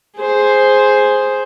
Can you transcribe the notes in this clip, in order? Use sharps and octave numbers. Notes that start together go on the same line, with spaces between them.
G#4 C5